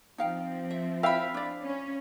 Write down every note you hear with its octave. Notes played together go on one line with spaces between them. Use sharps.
F3 C4 D#4 F5 G5
E5
E4 E5 F5 G5 B5
D4 D5
C#4